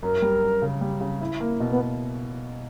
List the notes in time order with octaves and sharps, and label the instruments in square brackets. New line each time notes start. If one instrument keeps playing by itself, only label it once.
[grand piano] F#2 [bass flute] A#4
[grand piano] G3
F#2
C#3
G3
C#3
E4
A#3
B2
[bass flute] B3